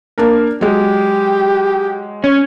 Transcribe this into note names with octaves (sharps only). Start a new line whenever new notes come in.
A#3 D4 A#4
F#3 G#3 G4
C#4 C#5